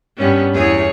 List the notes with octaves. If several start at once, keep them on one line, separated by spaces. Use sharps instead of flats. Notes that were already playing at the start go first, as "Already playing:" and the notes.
G2 B3 C#4
E2 G#4 C#5